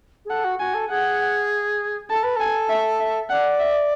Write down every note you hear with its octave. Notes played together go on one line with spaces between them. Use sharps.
G#4
A4 F#5
F#4
F#4 G#5
A4
G#4 F#5
A4 A5
B4
A4 G#5
E5
E5
D5 F#5
E5